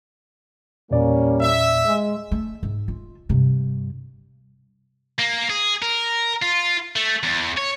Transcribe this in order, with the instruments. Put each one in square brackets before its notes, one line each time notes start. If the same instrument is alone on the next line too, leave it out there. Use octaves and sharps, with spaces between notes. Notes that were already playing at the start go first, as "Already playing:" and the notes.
[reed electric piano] E2 A#2 D5 [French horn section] G3 A#3 C#4
[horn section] E5
[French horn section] G#3
[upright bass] A3
G#2
F4
G2 C3
[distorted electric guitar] A#3
G#4
A#4
F4
A3
E2
C#5